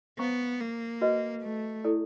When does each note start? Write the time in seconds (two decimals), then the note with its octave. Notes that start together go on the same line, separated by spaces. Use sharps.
0.19 B3 C5 F5 A#5 C#6
0.60 A#3
1.01 F#4 B4 D#5
1.43 A3
1.84 E4 A4 D5